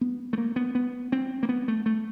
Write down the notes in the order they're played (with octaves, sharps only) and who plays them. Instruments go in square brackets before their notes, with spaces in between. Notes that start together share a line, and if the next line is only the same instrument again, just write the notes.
[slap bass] B3
A3
A#3
B3
B3
C4
A#3
B3
A3
A3